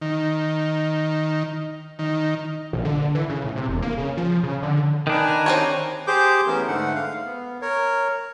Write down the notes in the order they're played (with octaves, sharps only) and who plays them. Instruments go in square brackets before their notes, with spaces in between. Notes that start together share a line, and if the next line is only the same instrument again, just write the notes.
[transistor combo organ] D#3
D#3
[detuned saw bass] A#1
D3
E3
C#3
A2
C3
E1
A#3
C#3
F3
C#3
D3
[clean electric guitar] D#3 D4 [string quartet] B4 G#5 A#5
[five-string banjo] C4 G4 C#5
[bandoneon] G4 G#4 C5 D6 G6
E3 A3 B3 C#4 A#4
G#2 D3 A3 F#5
F5
B3
A#4 C#5